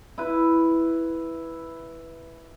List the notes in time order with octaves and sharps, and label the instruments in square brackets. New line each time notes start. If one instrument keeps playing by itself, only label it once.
[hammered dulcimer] E4 B4